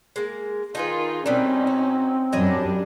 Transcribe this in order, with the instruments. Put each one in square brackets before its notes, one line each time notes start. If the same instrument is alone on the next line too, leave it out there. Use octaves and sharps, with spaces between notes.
[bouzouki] G#3 A#3
[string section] D#3 F4 [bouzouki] D#4 G#4 B4
[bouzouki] B2 G3 [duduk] C4 [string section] C#4 D#4
[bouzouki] F#4
[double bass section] F#2 [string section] G3 D4 [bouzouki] C#5 D#5 G#5